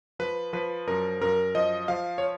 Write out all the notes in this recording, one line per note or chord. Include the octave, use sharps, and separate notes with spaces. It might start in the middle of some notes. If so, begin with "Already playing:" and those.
F3 B4
F3 B4
F#2 A#4
F#2 A#4
F3 D#5
F3 F5
C#5